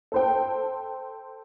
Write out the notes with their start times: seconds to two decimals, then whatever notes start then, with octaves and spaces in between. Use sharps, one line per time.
0.12 A4 C5 G5